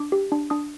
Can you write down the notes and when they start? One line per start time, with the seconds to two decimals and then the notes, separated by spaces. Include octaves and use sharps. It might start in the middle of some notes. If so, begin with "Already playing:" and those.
Already playing: D4 D6
0.12 G4
0.32 D4
0.50 D4 D#6